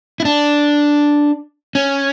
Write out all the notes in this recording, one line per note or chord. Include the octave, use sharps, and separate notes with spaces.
E4
D4
C#4